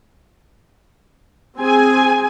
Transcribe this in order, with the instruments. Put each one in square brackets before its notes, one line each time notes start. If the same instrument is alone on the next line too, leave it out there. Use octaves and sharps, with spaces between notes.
[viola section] C4 G#4 G#5